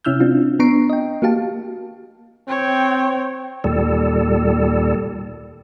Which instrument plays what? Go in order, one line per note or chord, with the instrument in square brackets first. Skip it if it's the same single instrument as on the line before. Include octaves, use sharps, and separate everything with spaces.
[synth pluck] C3 C#4 E4 E6 F6 G6
C4 D4 F4
B3 D4 A#5 C#6 C7 D7
D#5 G5
A#3 F#4 G4 F5 A5
[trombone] C4 [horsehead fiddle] C#5 G5
[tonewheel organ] D#2 A#2 G3 A4